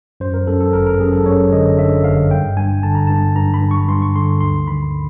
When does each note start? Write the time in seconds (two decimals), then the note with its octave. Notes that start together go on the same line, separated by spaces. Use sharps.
0.20 F#2 C5
0.34 A#4
0.47 F#2 A4
0.61 A4
0.73 G1 A#4
0.86 A#4
1.00 F#2 G#4
1.13 A4
1.26 F#2 C#5
1.52 D3 D#5
1.79 D3 E5
2.04 G1 F5
2.31 G2 G5
2.57 G2 G#5
2.83 D3 A5
2.95 A#5
3.07 G2 A5
3.36 G2 A#5
3.54 B5
3.62 G2
3.71 C#6
3.88 G2 C6
4.02 C#6
4.15 D3 C6
4.41 D2 C6
4.67 D#3 B5